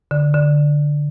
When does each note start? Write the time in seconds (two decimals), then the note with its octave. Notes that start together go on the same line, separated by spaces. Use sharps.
0.11 D3
0.34 D3